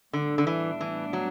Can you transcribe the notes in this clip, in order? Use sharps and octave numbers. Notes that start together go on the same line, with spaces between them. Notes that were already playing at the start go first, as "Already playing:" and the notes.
A2 D3 G3 B3 D4
D3
E3
E3
F#3